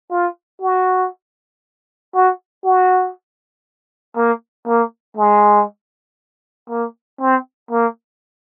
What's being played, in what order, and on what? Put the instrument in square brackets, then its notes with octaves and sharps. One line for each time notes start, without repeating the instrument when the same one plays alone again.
[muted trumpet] F4
F#4
F#4
F#4
A#3
A#3
G#3
A#3
C4
A#3